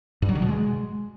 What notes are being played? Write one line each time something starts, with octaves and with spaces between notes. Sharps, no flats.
G2
F#3
D3
B2
G#3